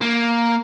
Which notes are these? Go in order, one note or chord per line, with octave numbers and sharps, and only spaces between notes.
A#3